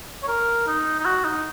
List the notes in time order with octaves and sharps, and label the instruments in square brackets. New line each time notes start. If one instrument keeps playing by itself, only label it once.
[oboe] C#5
A#4
D#4
D#4
F#4
D#4